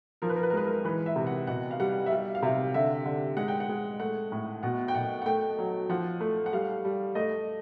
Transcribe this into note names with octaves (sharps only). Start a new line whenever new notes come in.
F3 A#4
B4
A#4
B4
A#4
G#3 B4
A#4
E3 B4
E5
C3
F#5
B2 F#5
F5
G3 F#5
E5
G3 F5
F5
C3 E5
D3 E5
D3
G#3 F#5
G5
F#5
G#3
A3 F#5
A2
B2 F#5
G5
B2 F#5
F#5
A3 G5
F#3
F3 F#5
A3
F#5
G3 F5
G3
A3 D#5